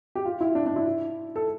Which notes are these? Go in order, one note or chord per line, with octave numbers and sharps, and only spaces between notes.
G4
F4
E4
D4
D4
E4
A4